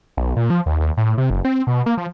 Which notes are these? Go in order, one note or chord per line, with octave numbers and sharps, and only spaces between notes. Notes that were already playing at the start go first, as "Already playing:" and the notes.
B1
A#2
F3
D#2
D#2
A2
C3
F#1
C4
B2
A#3
F3